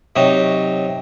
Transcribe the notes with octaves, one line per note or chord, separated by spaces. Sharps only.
C3 F#3 D#4